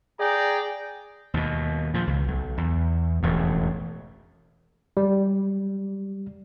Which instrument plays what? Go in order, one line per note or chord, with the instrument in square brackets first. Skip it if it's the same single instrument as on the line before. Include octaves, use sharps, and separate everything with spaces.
[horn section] G#4 D5 G5 A#5
[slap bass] D#2 B2
A#2 F3
C#2
B1
E2
E1 A1 F2
[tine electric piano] G3